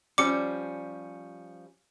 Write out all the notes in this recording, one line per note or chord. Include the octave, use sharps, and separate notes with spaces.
F3 G3 C#4 D6 C#7